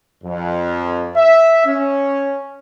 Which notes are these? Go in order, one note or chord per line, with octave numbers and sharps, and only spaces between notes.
F2
E5
C#4